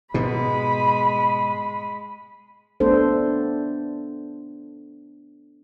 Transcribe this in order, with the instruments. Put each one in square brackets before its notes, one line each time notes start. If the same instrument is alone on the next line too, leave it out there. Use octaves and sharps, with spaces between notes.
[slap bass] G#2 B2 [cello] G#3 [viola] B5
[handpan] A3 B3 D4 A4 C5